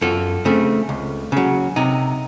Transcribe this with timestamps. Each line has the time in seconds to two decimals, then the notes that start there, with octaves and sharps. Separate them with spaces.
0.01 F#2 F4 A4
0.45 C#3 A3 C4
0.89 C#2
1.32 C#3 F#3
1.76 C3 D#4